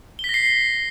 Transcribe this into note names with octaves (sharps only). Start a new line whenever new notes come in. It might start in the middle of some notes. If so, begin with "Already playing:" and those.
G7
B6
A#6
C7